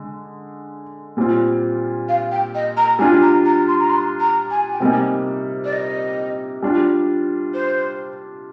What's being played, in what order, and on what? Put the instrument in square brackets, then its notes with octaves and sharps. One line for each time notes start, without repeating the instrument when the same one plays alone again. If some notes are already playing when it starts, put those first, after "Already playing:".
Already playing: [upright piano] D3 G#3
A#2 G3 C4 F4
[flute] F5
G5
D#5
A#5
[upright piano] G3 D4 F4 [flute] G#5
[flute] A#5
A#5
C6
A#5
C6
A#5
G#5
G5
[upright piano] C3 G3 A#3 D#4 [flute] G#5
[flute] D5
D#5
[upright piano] G3 D4 F4
[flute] C5